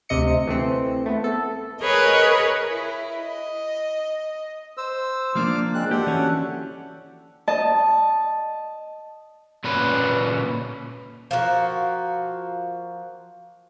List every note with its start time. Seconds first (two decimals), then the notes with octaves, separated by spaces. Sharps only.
0.09 D2 C3 D#5 C#7
0.47 E3 A3 C4
1.06 A3 B3
1.24 A4
1.82 G#4 A#4 B4 C#5 D#5
2.69 E4
3.17 D#5
4.77 C5 E6
5.35 F3 A#3 D4 D6 F6
5.74 G#3 C4 F#6
5.91 D4 G4 A4 F#5
6.07 E3 C#4 F#4
7.48 D#5 A5
9.64 A#2 C#4 B4
11.31 F3 A#3 F#4